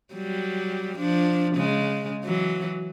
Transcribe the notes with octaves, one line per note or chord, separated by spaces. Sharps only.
F#3 G3
F3 D4
C#3 G#3
E3 F#3